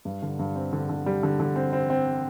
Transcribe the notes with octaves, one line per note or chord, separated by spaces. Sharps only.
G2
D3
G2
C4
D3
D3
G3
D3
D3
C4
C4
C4